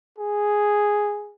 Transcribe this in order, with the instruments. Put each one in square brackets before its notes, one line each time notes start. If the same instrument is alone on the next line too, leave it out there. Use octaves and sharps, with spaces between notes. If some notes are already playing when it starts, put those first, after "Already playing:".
[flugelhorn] G#4